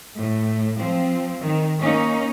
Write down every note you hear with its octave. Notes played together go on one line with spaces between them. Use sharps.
A2
F3 C4
D#3
A#3 C#4 D#4